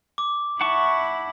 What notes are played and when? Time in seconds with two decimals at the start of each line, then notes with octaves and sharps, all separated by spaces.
0.18 D6
0.61 E4 F#5 A5 C#6